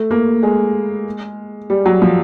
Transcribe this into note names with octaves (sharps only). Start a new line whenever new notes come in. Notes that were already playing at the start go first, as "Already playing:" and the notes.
Already playing: A3
A#3
G#3
G3
F#3
F3